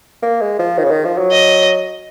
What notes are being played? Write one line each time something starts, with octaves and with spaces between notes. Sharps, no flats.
A#3
G#3
F3
D#3
C#3
D#3
F3
F#3
D#5